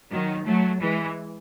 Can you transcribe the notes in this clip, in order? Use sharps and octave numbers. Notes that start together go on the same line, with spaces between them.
D#3 F#3
F#3 A3
E3 G#3